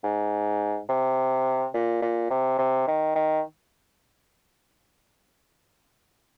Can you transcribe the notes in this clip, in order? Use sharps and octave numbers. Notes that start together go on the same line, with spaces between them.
G#2
C3
A#2
A#2
C3
C3
D#3
D#3